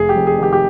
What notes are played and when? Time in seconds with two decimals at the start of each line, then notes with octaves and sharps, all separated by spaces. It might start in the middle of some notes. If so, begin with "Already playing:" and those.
Already playing: F1 G#4
0.09 G4
0.16 F2
0.27 G#4
0.38 D#3 G4
0.53 G4